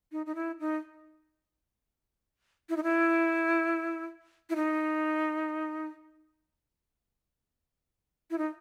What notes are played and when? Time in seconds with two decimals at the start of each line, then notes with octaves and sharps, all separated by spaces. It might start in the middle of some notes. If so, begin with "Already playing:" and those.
0.12 D#4
0.26 D#4
0.35 E4
0.60 D#4
2.69 E4
2.77 D#4
2.83 E4
4.50 E4
4.56 D#4
8.31 E4
8.38 D#4